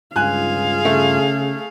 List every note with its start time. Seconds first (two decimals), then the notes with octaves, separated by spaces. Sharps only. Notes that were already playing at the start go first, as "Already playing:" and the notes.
0.16 C#2 G2 F4 G#4 F5 G#5 F#6
0.85 C#3 A3